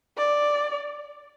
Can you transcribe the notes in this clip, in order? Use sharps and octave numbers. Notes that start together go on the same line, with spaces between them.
D5